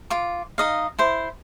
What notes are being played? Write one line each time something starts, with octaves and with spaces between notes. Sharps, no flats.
F4 D6
D#4 D#5 F5
E4 C5